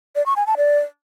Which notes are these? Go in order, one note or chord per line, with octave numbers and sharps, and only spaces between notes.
D5
C#6
G#5
A5
D5